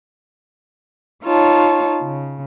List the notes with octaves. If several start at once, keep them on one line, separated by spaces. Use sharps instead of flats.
D#4 F4 C#5 A5
C#3